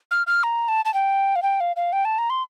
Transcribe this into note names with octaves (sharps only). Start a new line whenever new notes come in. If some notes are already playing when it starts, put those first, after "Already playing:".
F6
F6
A#5
A5
A5
G5
F5
G5
F5
F5
G5
A5
A#5
C6